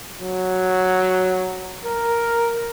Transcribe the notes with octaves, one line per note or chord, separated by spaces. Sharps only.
F#3
A#4